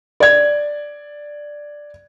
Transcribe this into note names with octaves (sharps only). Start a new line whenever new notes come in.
D5 G#6